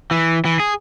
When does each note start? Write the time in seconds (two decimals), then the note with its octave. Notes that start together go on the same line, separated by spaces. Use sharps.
0.11 E3
0.45 E3
0.60 G#4